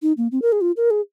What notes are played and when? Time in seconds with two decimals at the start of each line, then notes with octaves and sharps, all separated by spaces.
0.02 D#4
0.17 A#3
0.32 C4
0.42 A#4
0.52 G#4
0.61 F4
0.77 A#4
0.91 G#4